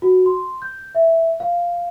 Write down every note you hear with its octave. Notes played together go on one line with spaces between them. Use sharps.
F#4
C6
G6
E5
F5